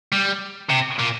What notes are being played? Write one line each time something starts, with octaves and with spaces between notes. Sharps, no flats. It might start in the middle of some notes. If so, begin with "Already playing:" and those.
G3
C3
A#2